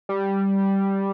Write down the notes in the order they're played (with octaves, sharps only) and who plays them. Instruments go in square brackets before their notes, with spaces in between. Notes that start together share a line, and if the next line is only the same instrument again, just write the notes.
[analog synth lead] G3